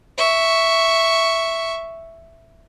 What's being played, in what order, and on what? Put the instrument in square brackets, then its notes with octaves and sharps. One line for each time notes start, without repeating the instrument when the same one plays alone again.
[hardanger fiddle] E5 C#6